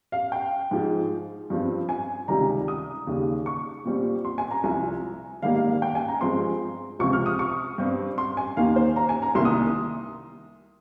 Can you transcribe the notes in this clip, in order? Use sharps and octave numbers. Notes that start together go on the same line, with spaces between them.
F5
G5
G#2 F3 G#3
G2 F3 C4
G#5
C#2 C3 D#3 G3 A#5
D#6
D#2 C#3 G3
C#6
A#2 G3 C4
C6
G#5
A#5
C2 C3 F3 G#5
G#2 D#3 G3 A#3 F5
F5
F5
G5
G#5
A#5
G2 F3 G#3 C4 C6
C#2 C3 F3 C4 C#6
F6
D#6
C#6
G2 G3 C4
C6
G#5
D#2 D#3 A#3 F5
C5
A#5
G#5
A#5
C2 C3 D#3 A#3 C6
D#6